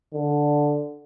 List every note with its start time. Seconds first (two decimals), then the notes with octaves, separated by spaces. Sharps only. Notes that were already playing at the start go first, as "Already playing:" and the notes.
0.14 D3